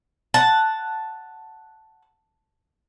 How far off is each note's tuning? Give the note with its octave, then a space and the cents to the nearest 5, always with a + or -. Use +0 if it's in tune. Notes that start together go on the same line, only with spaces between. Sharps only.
F#5 +0 A5 +0